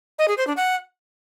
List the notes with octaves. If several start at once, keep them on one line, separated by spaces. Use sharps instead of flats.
D#5
G#4
C5
D4
F#5